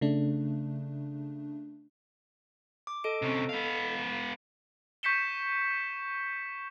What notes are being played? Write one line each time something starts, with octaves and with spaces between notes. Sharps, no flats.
C#3 A3 D4
D6
A4 D#5 D7
C3 C#4
B3 F5
C#6 G6 B6 C#7 E7 G7